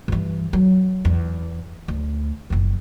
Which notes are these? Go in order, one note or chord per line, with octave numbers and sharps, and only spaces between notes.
G2 E3
F#3
E2
D2
F#1 F2